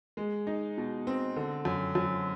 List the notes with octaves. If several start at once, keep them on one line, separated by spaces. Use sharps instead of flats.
G#3
D#4
B2
C4
D3
F#2
F#2